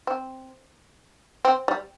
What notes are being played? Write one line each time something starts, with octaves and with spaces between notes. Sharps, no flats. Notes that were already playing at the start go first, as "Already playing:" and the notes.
C4
C4
G3